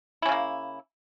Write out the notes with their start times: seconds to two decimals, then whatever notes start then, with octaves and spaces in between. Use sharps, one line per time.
0.22 E4
0.26 C#4
0.29 C#3
0.32 A#3